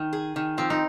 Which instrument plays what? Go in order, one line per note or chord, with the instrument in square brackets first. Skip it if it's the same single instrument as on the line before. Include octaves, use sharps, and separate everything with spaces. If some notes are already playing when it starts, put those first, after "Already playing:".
Already playing: [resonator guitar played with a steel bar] D#3
G#4
D#3
[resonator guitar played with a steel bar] F3 [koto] C4
[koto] D#4